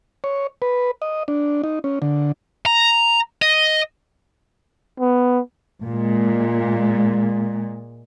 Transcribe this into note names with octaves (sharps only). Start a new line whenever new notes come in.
C#5
B4
D#5
D4
D#4
C#4
D3
A#5
D#5
B3
A#2 G#3